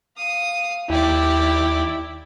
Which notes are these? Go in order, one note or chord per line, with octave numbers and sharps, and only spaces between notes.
F5 D#6
D#2 E4 G4 D5